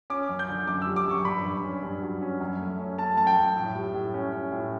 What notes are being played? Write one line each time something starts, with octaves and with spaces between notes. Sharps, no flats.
C#4 D6
F#2
G6
D3
F#2 D6
E6
G3
D6
F#2 C#6
G2 B5
G2
C#4
G2
F#3
C#4
F#2
A3
C#4
A3 A5
F#2 A5
G5
F#2
A2
G3
A2
C#4
C#4
A2